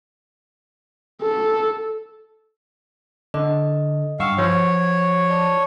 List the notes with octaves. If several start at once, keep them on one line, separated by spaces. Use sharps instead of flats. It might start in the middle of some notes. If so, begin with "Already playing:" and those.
A4
D3 D#5
G2 F5 F#5 C#6 E6
F3 C#5
D5 A5 D6